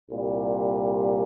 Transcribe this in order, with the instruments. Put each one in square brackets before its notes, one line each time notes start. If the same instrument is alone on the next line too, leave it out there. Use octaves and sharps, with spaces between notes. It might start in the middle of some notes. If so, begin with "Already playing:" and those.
[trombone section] C2 A#2 G3